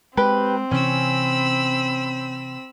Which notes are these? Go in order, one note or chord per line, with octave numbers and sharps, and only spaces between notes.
G#3 C4 G4 B4
C3 E3 C#4 B5 E6